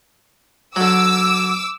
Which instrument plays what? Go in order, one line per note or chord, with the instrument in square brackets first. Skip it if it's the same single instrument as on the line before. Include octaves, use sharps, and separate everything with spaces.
[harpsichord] D3 F#3 [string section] D6 E6